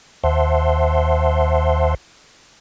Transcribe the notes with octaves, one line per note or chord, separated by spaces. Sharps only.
D#2 C5 E5 F#5 A5 C6